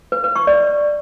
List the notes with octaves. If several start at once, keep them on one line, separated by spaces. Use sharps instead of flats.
B4
B4
C#6
D5